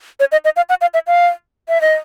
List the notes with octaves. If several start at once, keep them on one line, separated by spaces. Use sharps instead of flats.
C#5
D#5
D#5
F5
F#5
F5
E5
F5
E5
D#5